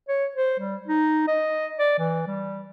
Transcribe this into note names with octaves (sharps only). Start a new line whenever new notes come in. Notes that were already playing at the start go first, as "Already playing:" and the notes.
C#5
C5
G3
D#4
D#5
D5
E3
G3